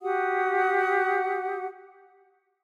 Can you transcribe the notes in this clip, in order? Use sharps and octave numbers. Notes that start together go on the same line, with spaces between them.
F#4 G4 F#5 D#6